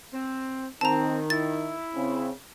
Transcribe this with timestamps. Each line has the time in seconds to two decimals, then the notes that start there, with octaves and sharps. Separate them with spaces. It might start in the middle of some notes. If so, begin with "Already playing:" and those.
0.13 C4
0.81 D#3 C4 A5 A#5
1.30 E4 A6
1.96 C#3 C4